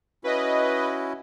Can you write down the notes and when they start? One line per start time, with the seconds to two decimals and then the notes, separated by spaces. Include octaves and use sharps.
0.24 C#4 E4 F#4 B4 D#5